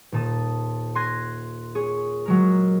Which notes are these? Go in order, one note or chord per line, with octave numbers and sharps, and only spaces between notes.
D#1 A#2 A5 D#6
C6 F#6 G#6 A#6 D#7
G#4 C#5
F#3 G#3 A#4